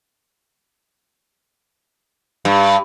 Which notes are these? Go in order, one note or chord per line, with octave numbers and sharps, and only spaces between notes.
G2